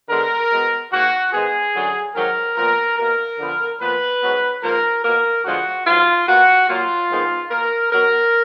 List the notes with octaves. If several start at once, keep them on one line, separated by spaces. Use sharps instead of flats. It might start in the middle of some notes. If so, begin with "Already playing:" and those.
D3 G#3 B3 A#4
B2 G#3 B3
G#2 D#3 A#3 F#4
G#2 D#3 G#3 B3 G#4
F#2 D3 F#3
G#2 D#3 F#3 A#3 A#4
A#2 F3 B3 A#4
B2 A#3 A#4
D3 F3 B3
A#2 F3 B3 B4
G#2 F#3 B3
G#2 F3 A#3 A#4
B2 A#3 A#4
D3 F3 G#3 B3 F#4
G#2 F#3 B3 F4
B2 A#3 F#4
A#2 F#3 A#3 F4
G#2 D#3 G#3 B3
B2 A#3 A#4
B2 F#3 B3 A#4